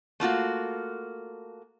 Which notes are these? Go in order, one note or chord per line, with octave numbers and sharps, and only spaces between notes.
A3 A#3 F4 F#4